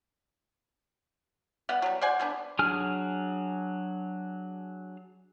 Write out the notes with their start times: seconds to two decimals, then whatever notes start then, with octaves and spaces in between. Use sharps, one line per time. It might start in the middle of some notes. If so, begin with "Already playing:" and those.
1.69 G3 B3 F#5
1.82 F#3 G3
2.01 C5 D5 F#5 G#5
2.19 G3 B3 D4
2.59 F#3 D4 G#4 G#5 F6